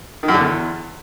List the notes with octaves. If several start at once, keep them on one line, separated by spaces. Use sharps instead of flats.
D#3
F#2
D3
E2